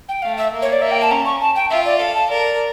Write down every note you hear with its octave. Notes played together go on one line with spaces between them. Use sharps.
G5
A3 F5
E5
A#3
C#5
D5
A#3 E5
G5
A5
C#4 A#5
C#6
A5
G5
F4 E5
D5
A4 F5
A5
A#4 D5